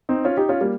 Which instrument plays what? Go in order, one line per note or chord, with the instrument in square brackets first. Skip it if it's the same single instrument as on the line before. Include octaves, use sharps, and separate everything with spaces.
[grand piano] C4 D#4
C#4 F4
D#4 G4
C#4 F4
G3 A#3